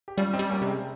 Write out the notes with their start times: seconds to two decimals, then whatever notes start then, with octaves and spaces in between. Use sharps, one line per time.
0.08 G4
0.17 G3 C#4 F4
0.33 C4 D#4
0.39 G3
0.50 A#3 C#4
0.61 C3
0.67 G#3 C4